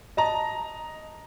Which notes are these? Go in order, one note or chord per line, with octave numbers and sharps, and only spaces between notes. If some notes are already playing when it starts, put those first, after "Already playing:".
D#5 A5 A#5